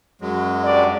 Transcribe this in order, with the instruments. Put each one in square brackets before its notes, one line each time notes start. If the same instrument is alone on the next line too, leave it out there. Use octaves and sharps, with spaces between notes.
[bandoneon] F#2 F#3 G#3
[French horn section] G2 F#4 D5